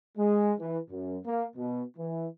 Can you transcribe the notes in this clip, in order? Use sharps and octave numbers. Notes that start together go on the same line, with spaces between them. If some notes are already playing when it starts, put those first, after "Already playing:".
G#3
E3
F#2
A#3
B2
E3